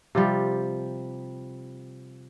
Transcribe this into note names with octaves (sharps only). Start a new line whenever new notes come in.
C3 F3 G3